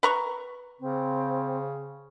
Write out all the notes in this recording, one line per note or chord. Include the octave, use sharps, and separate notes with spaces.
B4 A#5 C#6
C#3 C4